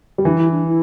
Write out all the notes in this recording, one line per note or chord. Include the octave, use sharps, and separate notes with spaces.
G3
E3 D4
E4
D4
E4